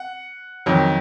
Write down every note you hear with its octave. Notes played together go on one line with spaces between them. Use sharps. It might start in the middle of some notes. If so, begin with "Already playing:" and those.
Already playing: F#5
F2 D#3 F#3